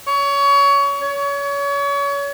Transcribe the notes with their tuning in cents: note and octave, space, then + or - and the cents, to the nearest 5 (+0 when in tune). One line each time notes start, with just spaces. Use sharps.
C#5 +25
C#5 +30